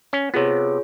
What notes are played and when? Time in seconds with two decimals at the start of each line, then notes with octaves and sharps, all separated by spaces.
0.13 C#4
0.34 C3 B3 F4 G#4 C#5